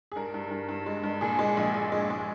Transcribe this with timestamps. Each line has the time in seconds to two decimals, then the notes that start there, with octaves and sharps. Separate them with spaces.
0.12 G#4
0.16 G2 A#4
0.34 G2
0.51 G2
0.69 G2
0.86 G#3
1.03 G2
1.21 A#2 G#4
1.39 G#3
1.57 A#1
1.74 A#1
1.92 G#3
2.10 G#3